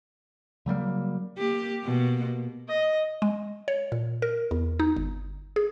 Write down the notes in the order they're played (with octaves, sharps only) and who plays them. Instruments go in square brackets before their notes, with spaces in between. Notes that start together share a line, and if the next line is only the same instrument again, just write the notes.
[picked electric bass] C#3 F#3 G3 A#3
[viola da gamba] A#3 G4
B2 A#3
[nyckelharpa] D#5
[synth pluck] G#3
C#5
A#2
A#4
E2
D#4
G1
G#4